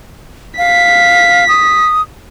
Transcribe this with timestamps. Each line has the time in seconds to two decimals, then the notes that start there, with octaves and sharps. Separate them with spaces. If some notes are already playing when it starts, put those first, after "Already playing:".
0.58 F5 B6
1.49 D#6